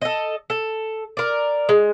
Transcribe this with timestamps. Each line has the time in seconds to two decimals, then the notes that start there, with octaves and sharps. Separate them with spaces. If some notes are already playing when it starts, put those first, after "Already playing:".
0.02 A4 D#5
0.50 A4
1.17 A#4 D5
1.69 G#3